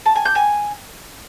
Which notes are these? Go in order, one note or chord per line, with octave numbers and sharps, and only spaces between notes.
A5
G#5
G6
G#5